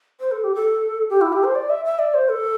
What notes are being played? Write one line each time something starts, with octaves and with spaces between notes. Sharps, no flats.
C5
A4
G4
A4
G4
E4
G4
C5
D5
E5
E5
D5
C5
A4